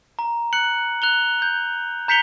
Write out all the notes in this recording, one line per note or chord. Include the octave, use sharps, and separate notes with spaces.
A#5
F#6 C#7 F#7
F#6 F7 G7
G6
A#5 G6 B6 C#7 F7 G7